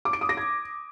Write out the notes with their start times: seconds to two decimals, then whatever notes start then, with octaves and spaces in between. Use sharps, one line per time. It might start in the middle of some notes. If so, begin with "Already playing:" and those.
0.05 D6
0.13 D7
0.21 D#6
0.29 A#6
0.37 G#6